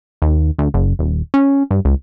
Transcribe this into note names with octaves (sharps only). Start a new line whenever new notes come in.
D#2
D2
F#1
D#1
C#4
G2
C#2